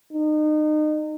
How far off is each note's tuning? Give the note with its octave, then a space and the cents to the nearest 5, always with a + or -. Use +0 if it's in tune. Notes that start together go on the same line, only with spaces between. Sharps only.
D#4 -30